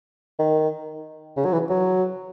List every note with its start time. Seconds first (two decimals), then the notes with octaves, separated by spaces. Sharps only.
0.39 D#3
1.37 C#3
1.45 F#3
1.53 E3
1.70 F#3